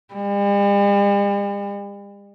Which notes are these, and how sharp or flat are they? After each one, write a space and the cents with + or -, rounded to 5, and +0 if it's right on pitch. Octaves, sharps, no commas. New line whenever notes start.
G3 +45